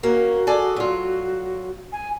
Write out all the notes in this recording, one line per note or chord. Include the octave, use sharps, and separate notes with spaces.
A#3 C#4 F#4
G#4 A4 D5
F#3 F4
G#5